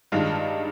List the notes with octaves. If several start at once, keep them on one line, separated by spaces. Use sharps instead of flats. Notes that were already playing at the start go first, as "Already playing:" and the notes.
G2 D#3 G#3 D4 F4